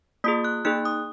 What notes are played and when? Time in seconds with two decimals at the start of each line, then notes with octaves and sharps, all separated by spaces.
0.24 A#3 F4 G#4 D#6
0.45 F#6
0.65 A#3 D#4 G#4 F#6
0.85 D#6